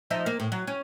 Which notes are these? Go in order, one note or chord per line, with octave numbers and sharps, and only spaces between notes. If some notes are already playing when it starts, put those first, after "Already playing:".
F3 D#4 E5
A#3
A2
F#3
C#4